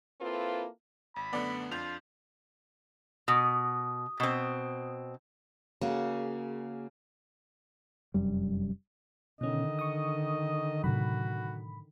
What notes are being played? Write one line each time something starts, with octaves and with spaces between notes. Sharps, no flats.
A#3 C4 E4 F4 A4 B4
G#1 B5
F#2 D3 A3 B3 D5
F2 D4 F4 G6 F7
B2 D#6
B2 C4
C#3 A#3 F#4 G#4
F1 F#2 G3
B2 D3 D#3 C#4 D#5
C#6 D#6
A2 C3 F#3 F#4 B5